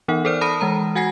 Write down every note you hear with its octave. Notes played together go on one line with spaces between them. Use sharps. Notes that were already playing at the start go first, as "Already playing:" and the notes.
E3 B3 D#4 A#4 F#5
A4 A#4 C5 D5 F6
A5 B5 D#6 A#6 D#7
E3 G#3 A#5
F#4 F#5 G#5 G#6 A#6 C7